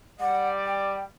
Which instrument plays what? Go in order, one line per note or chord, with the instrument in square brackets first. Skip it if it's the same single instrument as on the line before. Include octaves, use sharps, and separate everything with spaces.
[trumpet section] G3 D5 [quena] F#5
[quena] G5